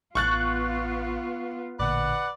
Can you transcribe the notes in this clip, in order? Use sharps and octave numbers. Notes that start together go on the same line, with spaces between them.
A1 B3 F4 C#6 F#6 A6
A1 A#2 D3 B4 D5 F#5